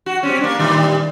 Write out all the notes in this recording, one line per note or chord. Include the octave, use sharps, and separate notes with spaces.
F#4
G3 C4 C#4
A#3 D4
A2 D#3 G3